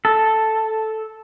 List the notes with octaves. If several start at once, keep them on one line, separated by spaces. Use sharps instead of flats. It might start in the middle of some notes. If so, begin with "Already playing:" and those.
A4